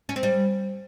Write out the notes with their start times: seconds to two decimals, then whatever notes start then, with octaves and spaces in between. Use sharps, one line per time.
0.09 C#4
0.16 C4
0.23 G3